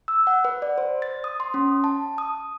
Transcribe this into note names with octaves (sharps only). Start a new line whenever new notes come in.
E6
F#5
B4
D5
C5
A6
D#6
C6
C#4
A5
D#6